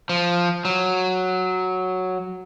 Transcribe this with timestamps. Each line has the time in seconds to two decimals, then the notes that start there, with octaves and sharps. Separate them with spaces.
0.09 F3
0.65 F#3